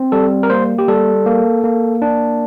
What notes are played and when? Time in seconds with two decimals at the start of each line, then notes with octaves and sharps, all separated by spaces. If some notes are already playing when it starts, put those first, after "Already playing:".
Already playing: C4
0.12 G3 A4
0.43 A#4
0.50 A#3 C5
0.78 G4
0.88 G3 A4
1.26 A#3
1.64 A#3
2.02 D4